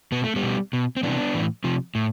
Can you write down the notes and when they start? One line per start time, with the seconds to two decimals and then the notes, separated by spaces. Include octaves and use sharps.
0.12 B2 B3
0.24 A3
0.36 G3 B3
0.43 B2
0.73 B2
0.97 C4
1.03 C3 E3 B3 D4
1.34 A2 E3
1.64 C3 F3
1.95 A2